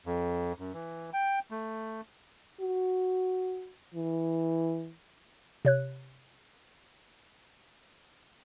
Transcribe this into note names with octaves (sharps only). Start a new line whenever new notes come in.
F2
F#2
E3
G5
A3
F#4
E3
C3 C#5 F#6